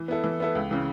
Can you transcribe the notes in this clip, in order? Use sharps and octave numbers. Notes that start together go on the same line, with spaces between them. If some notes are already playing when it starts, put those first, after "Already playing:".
Already playing: E3
B3 E4 A4
E3
B3 E4 A4
C#2
C#3 E3